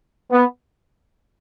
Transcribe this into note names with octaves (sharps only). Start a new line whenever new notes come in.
B3